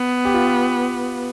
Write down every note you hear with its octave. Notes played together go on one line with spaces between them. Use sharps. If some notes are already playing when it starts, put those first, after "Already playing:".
Already playing: B3
G4
F4